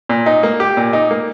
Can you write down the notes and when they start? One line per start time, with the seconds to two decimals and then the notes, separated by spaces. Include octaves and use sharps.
0.09 A#2
0.26 D#4
0.43 A#3
0.60 G4
0.77 A#2
0.93 D#4
1.11 A#3